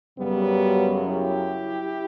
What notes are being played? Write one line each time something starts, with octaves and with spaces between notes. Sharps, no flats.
F#2 C#3 F#3 G3 B3
E4 G4